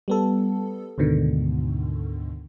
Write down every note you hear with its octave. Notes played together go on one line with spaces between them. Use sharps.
G3 B3 A4
D2 G#2 B2 D3 D#3